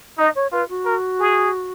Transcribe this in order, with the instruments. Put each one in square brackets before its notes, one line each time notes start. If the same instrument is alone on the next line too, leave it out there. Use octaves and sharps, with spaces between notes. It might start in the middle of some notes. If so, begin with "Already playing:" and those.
[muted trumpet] D#4 [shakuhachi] D#5
[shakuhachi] C#5
[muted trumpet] F4 [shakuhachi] B4
[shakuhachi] F#4
[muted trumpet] A#4
G#4